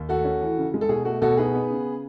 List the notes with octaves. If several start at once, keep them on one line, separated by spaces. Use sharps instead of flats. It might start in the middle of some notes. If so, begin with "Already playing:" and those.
Already playing: D#2
A3 F#4 A4
C#4
E3
C#3
G#3
A4
B2 G#4
A3 F#4
B2 F#4 A4
D#4 G#4 B4
B3
C#3